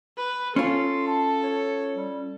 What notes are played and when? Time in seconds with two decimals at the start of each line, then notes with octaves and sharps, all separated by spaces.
0.17 B4
0.56 C#4 F4 A4 C6
1.07 A5
1.44 C#5
1.96 G3